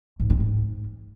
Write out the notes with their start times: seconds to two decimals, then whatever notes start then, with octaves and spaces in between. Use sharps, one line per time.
0.20 G#2
0.30 C4
0.40 G#2